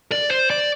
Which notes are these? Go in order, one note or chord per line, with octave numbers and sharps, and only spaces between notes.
D5
C5
D5